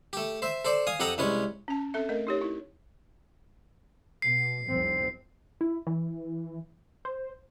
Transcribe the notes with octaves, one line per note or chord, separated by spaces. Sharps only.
A3 G4
C5 E5
A4 C5 D5
F5 G#5 D#6
F2 G4 A4 F#5 A#5 D#6
C2 G#3 C#4 B4 C#5
C#4 A5
C4 A4 E5
A3 A#4 D#5
D#4 G4 C#5
E4
B2 C7
F1 C2 C4
E4
E3
C5